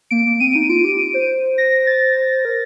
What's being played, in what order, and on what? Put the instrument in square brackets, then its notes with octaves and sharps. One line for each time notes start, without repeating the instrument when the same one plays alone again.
[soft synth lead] A#3 [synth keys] D7
[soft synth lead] A#3
[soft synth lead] C4 [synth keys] D#7
[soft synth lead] D#4
[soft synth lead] F4 [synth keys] D7
[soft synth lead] G4
C5
[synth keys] A#6
A6
[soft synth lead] A#4